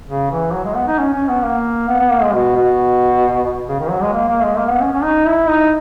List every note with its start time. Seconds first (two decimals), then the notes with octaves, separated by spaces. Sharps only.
0.08 C#3
0.31 E3
0.53 F#3
0.65 G#3
0.76 B3
0.87 D#4
0.98 C#4
1.13 C#4
1.28 B3
1.43 A#3
1.88 B3
1.99 B3
2.11 A#3
2.23 G#3
2.33 B2
2.55 B2
3.68 C#3
3.80 D#3
3.90 F#3
4.02 G#3
4.13 A#3
4.29 A#3
4.43 G#3
4.58 A#3
4.69 B3
4.80 C#4
4.92 C#4
5.03 D#4
5.26 E4
5.48 D#4